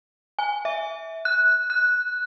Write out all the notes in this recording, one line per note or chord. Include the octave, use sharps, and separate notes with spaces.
G#5
E5
F#6
F#6